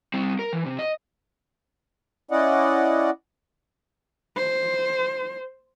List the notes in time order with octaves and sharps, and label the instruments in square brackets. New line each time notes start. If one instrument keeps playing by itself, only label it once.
[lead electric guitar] G3 C4
A#4
E3
C3
D#5
[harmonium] C#4 E4 D5 D#5 F#5
[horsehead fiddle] C5